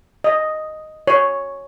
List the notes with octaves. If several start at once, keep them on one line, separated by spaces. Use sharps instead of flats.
D#5
C#5